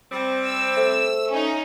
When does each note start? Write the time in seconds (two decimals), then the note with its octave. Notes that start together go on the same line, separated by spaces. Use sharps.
0.11 G3 C4
0.45 E6
0.77 A3 C5
1.30 C#4 D#4